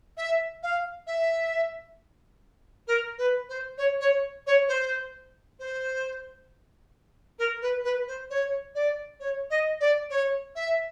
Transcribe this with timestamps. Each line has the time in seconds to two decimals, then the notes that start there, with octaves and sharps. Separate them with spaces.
0.17 E5
0.63 F5
1.07 E5
2.87 A#4
3.18 B4
3.49 C5
3.78 C#5
4.01 C#5
4.47 C#5
4.68 C5
5.59 C5
7.39 A#4
7.62 B4
7.84 B4
8.08 C5
8.30 C#5
8.75 D5
9.20 C#5
9.50 D#5
9.80 D5
10.10 C#5
10.55 E5